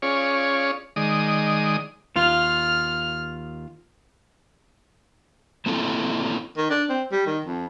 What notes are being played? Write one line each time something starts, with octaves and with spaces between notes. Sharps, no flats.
C#4 F4 G#4 C#5 D5
D#3 G#3 D5 D#6
D#2 F4 F6
A#3 C4 E4 F4 A4
D#3
D4
C4
G3
D#3
F2